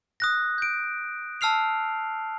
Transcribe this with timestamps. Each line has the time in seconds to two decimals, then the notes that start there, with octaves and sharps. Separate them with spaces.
0.20 D#6 F#6 A#6
0.58 G6 D7
1.41 A5 E6 F6 C7 F7